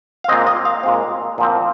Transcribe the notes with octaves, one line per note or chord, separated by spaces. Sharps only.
F5
A#2 G#3 C4 D#5
D#5
F5
A#2 G#3 C4
A#2 F3 C4